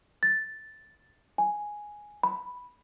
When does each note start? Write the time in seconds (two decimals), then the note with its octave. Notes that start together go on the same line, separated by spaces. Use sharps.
0.23 A6
1.38 G#5
2.23 B5